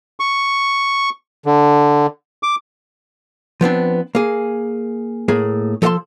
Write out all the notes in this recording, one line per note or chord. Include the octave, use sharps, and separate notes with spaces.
C#6
D3
D6
F3 B3 C4 D4
A#3 G#4
A2 A#3 G#4
F3 A4 D#5 F#5 A5 C6